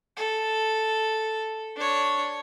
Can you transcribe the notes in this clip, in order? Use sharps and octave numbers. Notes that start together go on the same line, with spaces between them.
A4
D4 C#5